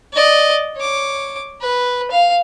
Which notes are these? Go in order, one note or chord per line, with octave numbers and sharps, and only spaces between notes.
D5 D#5
C#5 D6
B4
F5